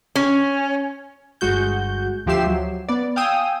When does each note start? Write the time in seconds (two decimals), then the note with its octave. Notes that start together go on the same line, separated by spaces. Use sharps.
0.15 C#4
1.41 G1 G#3 F#4 G6
2.26 D2 F3 G4 E5 C7 E7
2.47 F#3
2.88 B3 D5
3.16 F5 G5 G#5 D#6 E6 G6